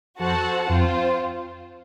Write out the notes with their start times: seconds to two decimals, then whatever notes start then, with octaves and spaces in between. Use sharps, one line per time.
0.19 F2 F#4 A4 C5 F#5 A5
0.69 F2 C4 F4 C5